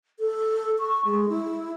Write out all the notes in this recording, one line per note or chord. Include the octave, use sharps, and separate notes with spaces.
A4
C#6
G#3
E4